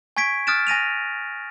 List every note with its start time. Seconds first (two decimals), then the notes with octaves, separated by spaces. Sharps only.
0.17 G#5 C#6 G#6 B6 D7
0.47 D#6 F6 F#6 A6 D7 E7
0.67 G#5 A#6 D#7 F7